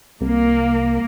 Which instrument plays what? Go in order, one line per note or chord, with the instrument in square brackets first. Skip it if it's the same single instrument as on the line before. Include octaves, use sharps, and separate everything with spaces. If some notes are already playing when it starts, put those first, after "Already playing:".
[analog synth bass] C2 [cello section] A#3